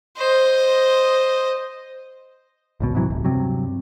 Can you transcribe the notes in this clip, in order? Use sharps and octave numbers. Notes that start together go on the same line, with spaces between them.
C5 D#5
G#1 C#2 B2
G#2 C3 E3 F#3
D1
G2 C3 F#3